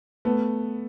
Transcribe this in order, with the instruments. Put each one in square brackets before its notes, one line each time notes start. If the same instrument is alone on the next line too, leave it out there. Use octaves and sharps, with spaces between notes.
[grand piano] A3 B3